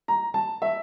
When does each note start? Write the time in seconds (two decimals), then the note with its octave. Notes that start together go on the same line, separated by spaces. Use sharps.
0.08 A#5
0.34 A5
0.62 E5